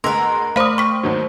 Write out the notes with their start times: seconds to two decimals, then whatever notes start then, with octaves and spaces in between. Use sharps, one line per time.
0.04 D2 G#3 A#4 B4 C6 E6
0.56 A3 C5 F5 B5 D6 D#6 F6
0.78 G5 C#6 B6
1.03 D#2 D#3 F#3